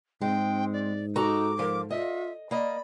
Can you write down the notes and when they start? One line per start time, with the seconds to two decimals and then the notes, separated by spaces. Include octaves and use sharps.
0.21 G#2 G#3 C4 G5
0.73 D5
1.16 D#4 F#4 A4 A#5 D6
1.59 F3 A#4
1.90 F4 D#5 E5
2.51 A#3 D5 D#5 B5